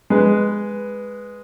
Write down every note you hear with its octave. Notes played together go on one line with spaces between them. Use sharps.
G#3 B4